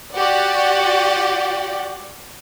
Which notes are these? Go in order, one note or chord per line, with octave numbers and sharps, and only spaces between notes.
F#4 G4 D5 F#5